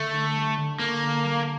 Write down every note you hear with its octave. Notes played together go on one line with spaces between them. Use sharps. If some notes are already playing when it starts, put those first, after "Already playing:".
Already playing: D3 A3
D4
G3
D3
D3 A#3
D4
G3